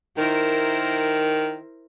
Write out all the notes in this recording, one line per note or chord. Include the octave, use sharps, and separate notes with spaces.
D#3 E4 A#4 C5